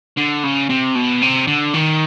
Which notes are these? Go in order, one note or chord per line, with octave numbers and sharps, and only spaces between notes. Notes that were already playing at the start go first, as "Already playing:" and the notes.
D3
C#3
C3
B2
C3
D3
D#3